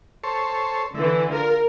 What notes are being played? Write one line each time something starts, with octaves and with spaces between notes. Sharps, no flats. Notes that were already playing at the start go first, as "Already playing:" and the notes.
A4 C5 C#5
D3 E3 E4
F4 A#4